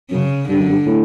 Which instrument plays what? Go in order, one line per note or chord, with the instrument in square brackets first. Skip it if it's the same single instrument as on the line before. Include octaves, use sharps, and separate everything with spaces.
[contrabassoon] F#2 [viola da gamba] C#3
[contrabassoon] G2 [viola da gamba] D3
[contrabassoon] F#2
G2
A2